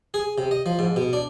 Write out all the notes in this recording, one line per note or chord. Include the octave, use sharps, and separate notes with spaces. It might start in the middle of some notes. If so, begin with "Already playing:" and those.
G#4
C3
D#5
F3
G#2
B2
D4